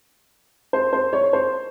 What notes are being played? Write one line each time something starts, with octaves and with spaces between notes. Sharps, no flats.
C5
C5
C#5
C5